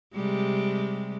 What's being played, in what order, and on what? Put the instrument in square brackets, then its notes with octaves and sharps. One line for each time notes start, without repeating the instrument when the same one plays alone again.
[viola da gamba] C3 G3 G#3